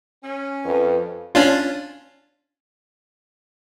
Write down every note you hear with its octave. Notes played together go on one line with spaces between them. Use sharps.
C#4
F2 B4
C#4 D4 F4